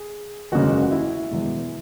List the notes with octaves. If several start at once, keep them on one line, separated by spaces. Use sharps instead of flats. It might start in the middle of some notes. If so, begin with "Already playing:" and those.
Already playing: G#4
F#1 E2 C#3 G#3 F#4
F#4
E4
E1 E2 B2 G#3